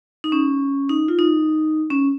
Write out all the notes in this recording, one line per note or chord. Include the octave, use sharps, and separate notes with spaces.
D#4
C#4
D#4
F4
D#4
C#4